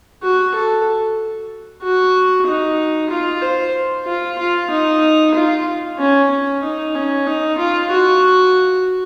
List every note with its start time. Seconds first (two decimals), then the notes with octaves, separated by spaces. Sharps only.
0.23 F#4
0.55 A4
1.83 F#4
2.47 D#4
3.10 F4
3.42 C5
4.06 F4
4.38 F4
4.71 D#4
5.35 F4
5.99 C#4
6.31 C#4
6.63 D#4
6.95 C#4
7.27 D#4
7.58 F4
7.91 F#4